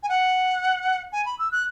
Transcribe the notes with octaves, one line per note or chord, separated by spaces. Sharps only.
G#5
F#5
G#5
B5
E6
F#6